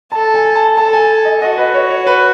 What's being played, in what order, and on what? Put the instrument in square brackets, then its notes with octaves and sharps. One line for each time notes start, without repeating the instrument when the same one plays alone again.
[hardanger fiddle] A4 [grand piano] A5
[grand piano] G#5
A5
[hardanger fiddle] A4 [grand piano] A5
[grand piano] G#5
G#5
D#5
[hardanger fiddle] F#4 [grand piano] D#5
[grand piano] B4
C#5
C#5
B4